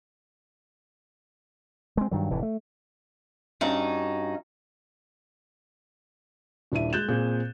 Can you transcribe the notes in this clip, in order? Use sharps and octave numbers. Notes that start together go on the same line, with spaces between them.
G#3 C4
G2 D#3 F#3
F1 A2 E3
A3
G2 C#4 D#4 F#4
D#1 D4 E4 E5 D#7
G#3 F#6 G6 A6 E7
A#2 C4 G#4